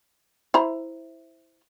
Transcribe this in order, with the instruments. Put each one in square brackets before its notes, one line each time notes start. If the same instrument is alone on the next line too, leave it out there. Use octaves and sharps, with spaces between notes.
[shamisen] E4 C5 A#5